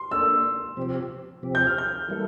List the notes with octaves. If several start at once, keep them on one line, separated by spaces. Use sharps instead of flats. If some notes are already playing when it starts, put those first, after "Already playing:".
Already playing: C6
A#3 D4 A4 D5 E6
C3 F3 C4 G4
C3 F3 C4 G4
G6
F6
G6
E3 G3 A#3 E4 A4